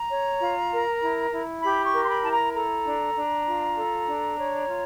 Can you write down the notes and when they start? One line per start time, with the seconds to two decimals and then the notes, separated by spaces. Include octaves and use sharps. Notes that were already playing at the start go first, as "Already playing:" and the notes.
Already playing: A#5
0.10 C#5
0.40 F4
0.71 A#4
1.01 E4
1.31 E4
1.62 G4 B5
1.85 C#6
1.92 A#4
2.03 C6
2.08 B5
2.23 E4 A5
2.31 A#5
2.54 A4 A#5
2.84 D4
3.15 D4
3.45 F4
3.76 A4
4.06 D4
4.37 C#5
4.67 F4